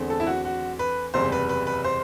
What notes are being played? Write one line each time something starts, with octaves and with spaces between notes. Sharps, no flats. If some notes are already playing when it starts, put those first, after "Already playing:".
Already playing: E2 D3 A3 C4
A4
E4
F#4
F#4
B4
F#1 E2 C3 G3 C5
B4
B4
B4
C5